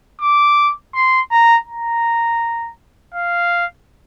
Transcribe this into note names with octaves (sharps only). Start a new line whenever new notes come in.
D6
C6
A#5
A#5
F5